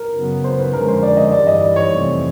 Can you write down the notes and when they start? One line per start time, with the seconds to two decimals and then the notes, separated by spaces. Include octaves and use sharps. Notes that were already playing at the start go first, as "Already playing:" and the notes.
Already playing: A#4
0.15 F#2 C#3 F#3 B3
0.44 C5
0.59 B4
0.73 F2 D3 F3 G#3 C#4 A#4
0.88 C5
1.03 D5
1.17 D#5
1.32 G2 E3 G3 D5
1.47 D#5
1.61 D5
1.76 C#5
1.91 F2 C3 E3 A3 C4